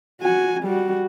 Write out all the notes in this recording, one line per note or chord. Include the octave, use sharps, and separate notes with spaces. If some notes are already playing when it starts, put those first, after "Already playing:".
F#4 G#5
G3 F#4